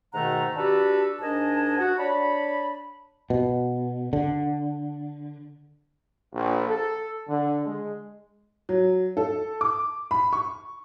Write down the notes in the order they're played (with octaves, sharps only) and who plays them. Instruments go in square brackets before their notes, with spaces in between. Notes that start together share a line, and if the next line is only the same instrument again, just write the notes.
[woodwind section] G#2 B2 D#3 A3 F#5 A#5
D4 F#4 G4 A4 B4 A5
G#2 D4 A#4 D#5 G#5 A5
F#4
D4 C#5 A5 B5
[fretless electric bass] B2
D3
[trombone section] A#1
A4
D3
G#3
[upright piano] F#3
A4
D6
B5
C#6